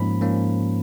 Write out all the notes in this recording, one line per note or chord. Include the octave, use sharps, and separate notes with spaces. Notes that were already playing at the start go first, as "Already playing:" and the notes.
Already playing: G#2 F3 A#3 C#4 B5
G#2 F3 A#3 C#4